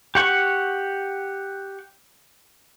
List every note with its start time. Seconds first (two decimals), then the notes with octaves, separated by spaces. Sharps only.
0.15 G4 F#5 C#6